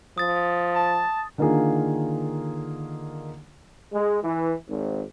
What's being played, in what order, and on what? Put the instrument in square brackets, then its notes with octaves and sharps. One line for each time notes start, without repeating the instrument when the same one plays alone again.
[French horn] F3 [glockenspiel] D#6 A6
[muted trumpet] A5
[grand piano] D3 D#3 A#3 F4 G#4
[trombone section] G#3
E3
G#1